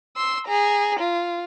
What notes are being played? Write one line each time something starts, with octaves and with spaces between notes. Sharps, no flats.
C6 E6
G#4 A#5
F4